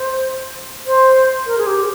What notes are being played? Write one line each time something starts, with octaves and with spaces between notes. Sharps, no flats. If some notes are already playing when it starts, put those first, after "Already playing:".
Already playing: C5
C5
A#4
G#4
G4